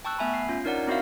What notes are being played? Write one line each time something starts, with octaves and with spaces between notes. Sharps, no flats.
G5 A5 C#6 E6 F#6
A3 B3 E5 G#5 B5 E6
C7
C#4 F4
D4 D#4 A#4 C#5 D5 F#5
C4 E4 F#4 A#4 E5 F5